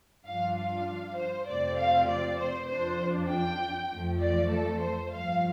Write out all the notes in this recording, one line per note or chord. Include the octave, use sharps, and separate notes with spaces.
G2 F3 D4 F4 F5
F5
C5
F2 C3 A3 C4 F4 D5
F5
D5
C5
F2 F3 D4 F4 C5
G5
F2 F3 A3
D5
A4
C5
G2 F3 A3 F5